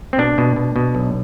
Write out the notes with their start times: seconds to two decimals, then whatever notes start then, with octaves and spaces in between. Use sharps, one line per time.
0.13 C4
0.18 B2 D4
0.38 B2
0.56 B2
0.76 B2
0.95 B1